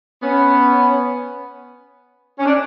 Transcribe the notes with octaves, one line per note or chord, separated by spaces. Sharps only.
B3 C#4
C#4
D4